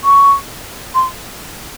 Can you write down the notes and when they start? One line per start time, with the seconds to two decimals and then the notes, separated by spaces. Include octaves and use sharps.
0.04 C#6
0.95 C6